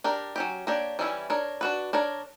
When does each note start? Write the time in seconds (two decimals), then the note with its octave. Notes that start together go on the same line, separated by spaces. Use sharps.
0.04 D4 G4 A#4
0.36 F#3 C#4 G4
0.67 A#3 D4 G4 C#5
0.99 E3 G3 C#4 E4
1.30 D4 A#4 C#5
1.61 D4 F#4 B4
1.93 D4 A#4 C#5